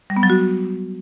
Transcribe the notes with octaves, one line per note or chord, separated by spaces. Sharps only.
G3
B3
F#3
F#4